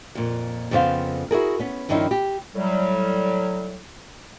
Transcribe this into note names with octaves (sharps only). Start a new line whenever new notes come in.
F2 A#2
F2 C#3 B3 C5 F5
E4 F#4 G#4 A#4
B3 C#4
G2 D#3 F3 C#4 D#4 E4
G4
A2 F#3 G3